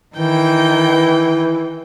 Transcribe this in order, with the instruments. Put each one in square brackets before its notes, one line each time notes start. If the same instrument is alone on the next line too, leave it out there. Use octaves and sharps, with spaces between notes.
[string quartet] D#3 G5 G6 [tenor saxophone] E3